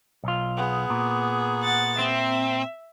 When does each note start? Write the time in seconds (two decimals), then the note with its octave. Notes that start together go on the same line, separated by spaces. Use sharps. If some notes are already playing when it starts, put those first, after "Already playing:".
0.24 B1 F4
0.57 B3 G#4
0.90 A#2
1.62 F#5 A6
1.99 C4 E5